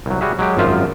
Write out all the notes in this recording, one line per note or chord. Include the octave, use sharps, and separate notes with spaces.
C2 F#3
G3 F#4 G#4 E5
F#3 G#3 G4
G#1 F#2 F3 F4 E5